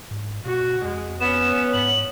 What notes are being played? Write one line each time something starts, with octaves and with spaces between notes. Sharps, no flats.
G#2
B2 F#4
F2 G#3
B3 C#4 E7
G#2 F#7